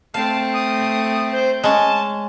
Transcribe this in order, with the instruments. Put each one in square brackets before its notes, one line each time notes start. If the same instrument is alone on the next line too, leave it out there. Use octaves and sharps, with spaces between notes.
[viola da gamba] A3 C4 [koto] F5 [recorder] A5
[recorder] D#6
C5
[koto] G#3 C#4 [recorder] A5